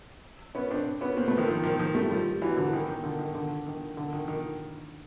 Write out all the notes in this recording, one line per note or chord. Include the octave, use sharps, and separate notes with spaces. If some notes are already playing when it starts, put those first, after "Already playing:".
B3 C#4
C4 D4
B3 C#4
A#3 C4
A3 B3
D#3 F3
D#3 F3
D#3 F3
D#3 F3
G3 A3
F3 G3
E3 F#3
D3 E3
D#3
D#3
D3
D#3
D3
D#3
D3
D#3
D#3